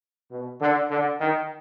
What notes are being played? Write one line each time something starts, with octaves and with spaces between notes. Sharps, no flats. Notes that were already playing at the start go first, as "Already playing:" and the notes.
B2
D3
D3
D#3